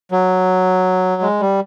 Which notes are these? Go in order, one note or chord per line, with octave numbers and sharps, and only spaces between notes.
F#3
G#3
G3